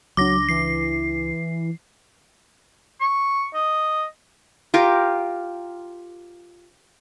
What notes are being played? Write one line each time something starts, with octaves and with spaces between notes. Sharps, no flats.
C#2 F#3 D4 D6 A#6
E3 C7
C#6
D#5
F4 G4 A#4